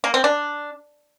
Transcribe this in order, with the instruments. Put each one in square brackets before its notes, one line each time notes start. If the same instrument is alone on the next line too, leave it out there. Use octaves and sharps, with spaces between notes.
[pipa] A#3
C4
D4